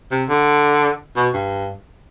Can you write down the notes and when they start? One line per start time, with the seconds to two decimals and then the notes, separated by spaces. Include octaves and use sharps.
0.11 C3
0.29 D3
1.16 B2
1.34 G2